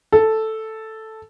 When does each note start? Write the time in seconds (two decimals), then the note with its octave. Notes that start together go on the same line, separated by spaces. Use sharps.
0.12 A4